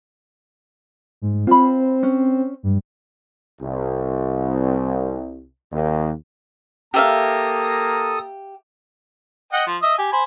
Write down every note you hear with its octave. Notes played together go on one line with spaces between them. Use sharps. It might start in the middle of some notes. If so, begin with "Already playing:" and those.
G#2
C4 F4 B5
C#4
G2
C2
D#2
A#3 G4 A4 E5 F5 A#5 D#6
D#5 F#5 G5
F3
D#5 E5 D#6
G4 G#5
C5 G#5 B5